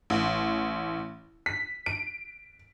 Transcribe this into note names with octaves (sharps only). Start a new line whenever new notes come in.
A1
B6
D7